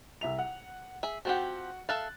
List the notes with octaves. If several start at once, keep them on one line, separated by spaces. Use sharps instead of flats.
C2 E5 F7
F#5
G#4 E5
F3 C4 F#4 G4 F#5
A4 E5 F5 F#6 A6